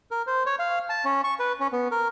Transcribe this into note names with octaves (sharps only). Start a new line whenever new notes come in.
A#4
C5
C#5
F5
A5
C#4
C#6
B4
C#4
B3
A#4